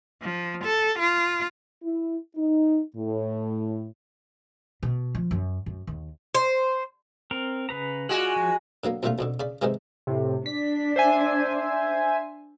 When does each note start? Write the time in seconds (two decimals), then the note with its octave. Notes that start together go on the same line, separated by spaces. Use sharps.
0.22 F3
0.64 A4
0.98 F4
1.83 E4
2.36 D#4
2.96 A2
4.83 B2
5.15 F3
5.31 F#2
5.66 F#2
5.87 D#2
6.35 C5
7.31 C4 A#4
7.69 C#3 B4 A#5
8.09 G#3 F4 F#4 D5 F#5
8.36 F3
8.84 D3 F#3 A#3 B3
9.03 F2 A#2 D3 G3 A3 F4
9.19 F2 B2 D3
9.40 C#3 D5 B5
9.62 G#2 C3 D#3 E3 G#3
10.07 A2 C3
10.46 D4 B6
10.96 C5 E5 G#5